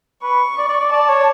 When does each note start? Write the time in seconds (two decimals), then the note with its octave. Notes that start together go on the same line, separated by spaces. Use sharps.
0.23 B4 C#6
0.58 D5
0.69 D5
0.81 D5
0.93 D5 A5
1.10 C#5